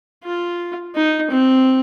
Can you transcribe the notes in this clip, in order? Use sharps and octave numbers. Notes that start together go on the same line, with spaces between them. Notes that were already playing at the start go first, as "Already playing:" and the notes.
F4
D#4
C4